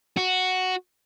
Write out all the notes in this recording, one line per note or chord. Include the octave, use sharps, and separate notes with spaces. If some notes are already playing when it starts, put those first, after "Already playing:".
F#4